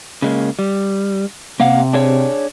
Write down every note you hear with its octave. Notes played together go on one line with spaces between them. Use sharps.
C#3 G#3 A#3
G3
C3 A#3 F5 F#5
D4 G#4 C#5